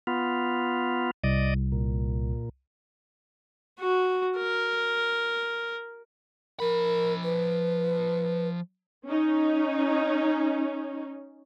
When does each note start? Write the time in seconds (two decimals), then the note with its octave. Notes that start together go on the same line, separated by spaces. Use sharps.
0.07 B3 F4
1.24 C2 D5 D#5
1.72 A#2
3.79 F#4
4.37 A#4
6.60 F3 A#4 B5
7.24 B4
9.06 C#4 D#4